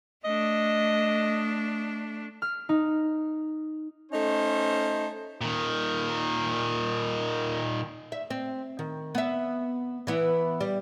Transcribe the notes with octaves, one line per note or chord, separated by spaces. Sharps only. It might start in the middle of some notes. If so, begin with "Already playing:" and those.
A3 D4 D#5
F6
D#4
A3 C#4 D#4 C5
A#2 D#3
E5
C4
D#3
B3 E5
E3 B3 E4
G3